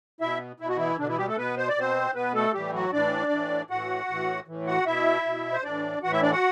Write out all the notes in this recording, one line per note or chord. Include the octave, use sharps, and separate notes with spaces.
B2 E4 E5
B2 E4
F#4
E3 E4
B2 D3 D4
E3 E4
G3 G4
A3 A4
B2 B3 B4
C5
D5
B2 C4 C5
B2 B3 B4
A3 A4
A2 E3 G3 G4
F#3 F#4
A2 E3 D4 D5
A2 E3
A2 E3 F#4 F#5
A2 E3
A2 E3
F#4 F#5
B2 E4 E5
B2
C5
A2 E3 D4 D5
A2 E3 F#4 F#5
E4 E5
D4 D5
F#4 F#5